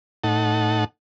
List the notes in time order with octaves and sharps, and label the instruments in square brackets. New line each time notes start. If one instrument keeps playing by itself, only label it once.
[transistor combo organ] A2 D#4 F#5 A5